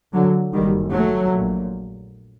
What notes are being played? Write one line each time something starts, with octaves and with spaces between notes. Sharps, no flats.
D3 F#3
F#1 F#2 D#3 G3
F#3 A3
A#1 A#2